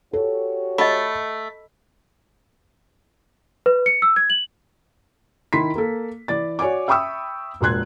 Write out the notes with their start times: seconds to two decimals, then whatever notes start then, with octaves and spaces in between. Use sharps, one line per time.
0.13 F#4 G4 A4 C#5
0.78 A3 D#5 B5
3.66 B4
3.86 C#7
4.02 E6
4.16 G#6
4.30 F#7
5.53 D#3 E4 C6 B6
5.76 A#3 A4
6.28 E3 D5 A6
6.59 F#4 C#5 D5 G#5 D6
6.88 E5 G5 B5 C#6 D#6 E6
7.61 E1 A#2 C6 F#6 G#6